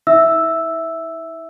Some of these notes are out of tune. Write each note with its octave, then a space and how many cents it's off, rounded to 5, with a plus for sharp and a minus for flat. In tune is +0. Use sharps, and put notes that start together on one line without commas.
E4 -45 E5 -5 E6 +0